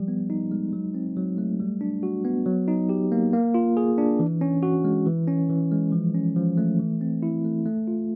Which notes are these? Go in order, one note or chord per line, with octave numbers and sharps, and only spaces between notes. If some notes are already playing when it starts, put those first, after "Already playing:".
Already playing: F3 G3
B3
D#4
G#3
F#3
C4
F#3
A3
G3
D4
F#4
B3
F#3
D#4
G4
A#3
A#3
F4
G#4
D4
E3
C#4
F#4
G#3
E3
C#4
E3
G#3
F3
C#4
F3
A3
E3
C4
E4
A3
A3
F4